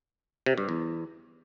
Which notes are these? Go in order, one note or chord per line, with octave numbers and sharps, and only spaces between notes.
C3
G2
E2